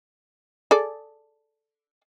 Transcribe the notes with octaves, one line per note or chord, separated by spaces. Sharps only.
G#4 A4 D5